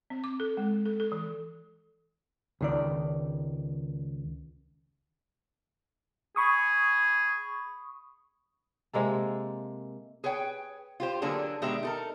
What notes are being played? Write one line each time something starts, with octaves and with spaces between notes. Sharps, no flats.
C4
D6
A4
G#3
A4
A4
E3
C#2 D#3 D5
G#4 B5 C#6 D#6
C3 G#3 A#3 A4
G#4 B4 C#5 G5
F4 G4 C5
D3 F#3 A#3 D4 G#4 A4
B2 D#3 G#3 D4 G4 E5
D#4 A4 A#4